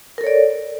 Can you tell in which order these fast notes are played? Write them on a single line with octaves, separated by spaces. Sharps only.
A#4 A4 C#5 D5